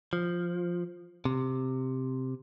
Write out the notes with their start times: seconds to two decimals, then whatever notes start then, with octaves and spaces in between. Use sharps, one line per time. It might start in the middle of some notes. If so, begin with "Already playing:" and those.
0.13 F3
1.25 C3